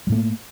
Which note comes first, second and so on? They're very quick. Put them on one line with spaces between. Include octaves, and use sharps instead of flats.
G3 A2 A3 A#3